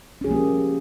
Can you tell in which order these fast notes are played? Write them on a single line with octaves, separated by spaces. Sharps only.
C#4 G#4 F3 A#3 G4